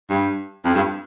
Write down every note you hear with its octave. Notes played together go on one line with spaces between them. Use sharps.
G2
F2
G2